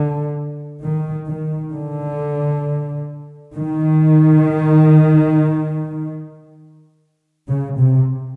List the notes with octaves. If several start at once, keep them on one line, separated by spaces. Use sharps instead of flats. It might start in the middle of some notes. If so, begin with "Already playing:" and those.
Already playing: D3
D#3
D#3
D3
D#3
C#3
C3